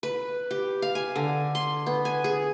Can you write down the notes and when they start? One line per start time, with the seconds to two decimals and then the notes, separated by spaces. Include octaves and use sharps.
0.03 B4
0.51 G4
0.82 F5
0.95 G#5
1.16 D3
1.55 C6
1.86 B3
2.05 G#5
2.24 G#4